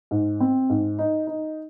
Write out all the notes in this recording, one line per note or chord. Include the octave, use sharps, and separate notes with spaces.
G#2
C4
G#2
D#4
D#4